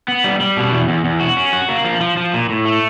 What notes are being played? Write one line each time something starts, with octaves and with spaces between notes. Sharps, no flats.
B3
G3
G3
B2
E2
E2
E2
F#4
C#4
F#4
A#3
F3
F3
F3
A#2
A2
A3